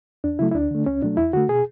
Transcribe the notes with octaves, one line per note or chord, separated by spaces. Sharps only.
E2 D4
C#3 F#3 A3 E4
E4
D2 D4
D3 A3
C#2 C#4
B2 F#3 A3 D4
E2 E4
D3 A3 F#4
B2 G#4